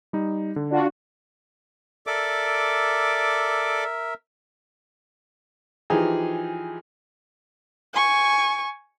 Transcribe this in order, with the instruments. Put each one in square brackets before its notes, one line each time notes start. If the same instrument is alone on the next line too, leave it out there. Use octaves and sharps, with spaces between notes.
[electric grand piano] G3 D#4
D3
[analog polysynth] D4 F4 F#4
[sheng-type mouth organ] A4 D5 D6 [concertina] A#4 E5
[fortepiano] E3 F3 D#4 G4 G#4
[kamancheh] G#5 C#6